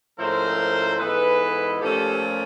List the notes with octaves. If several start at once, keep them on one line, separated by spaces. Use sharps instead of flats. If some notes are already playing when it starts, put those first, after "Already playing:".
G#2 F3 A3 C#4 E4 A#4 C5
G#2 E3 G#3 B3 A4 B4
A#2 F3 A3 C#4 G4 A4